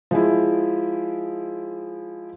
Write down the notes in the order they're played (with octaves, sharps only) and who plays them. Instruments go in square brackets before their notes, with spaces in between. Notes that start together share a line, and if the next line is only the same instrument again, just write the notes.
[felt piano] F3 G#3 E4